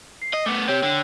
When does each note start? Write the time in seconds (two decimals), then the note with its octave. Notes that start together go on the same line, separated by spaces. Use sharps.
0.22 C7
0.33 D#5
0.46 A3 B3 D6
0.68 C4 G4 C#5 G5
0.83 D3